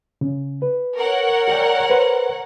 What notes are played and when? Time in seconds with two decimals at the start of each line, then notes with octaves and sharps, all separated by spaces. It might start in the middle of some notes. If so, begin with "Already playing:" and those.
0.21 C#3
0.62 B4
0.97 A#4 C#5 F#5
1.48 G#4 D5 G5
1.90 B4 C5